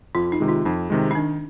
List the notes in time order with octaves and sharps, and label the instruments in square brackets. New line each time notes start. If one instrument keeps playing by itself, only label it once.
[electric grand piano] F2 [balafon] F4
[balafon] D#4
[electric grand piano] C3 D#3 G#3
[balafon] F4
[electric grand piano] F2 [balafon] D#4
[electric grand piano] C3 D#3 G#3
[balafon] D#4
[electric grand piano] D#3 [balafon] D4